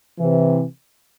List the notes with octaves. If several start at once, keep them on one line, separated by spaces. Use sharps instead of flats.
C3 E3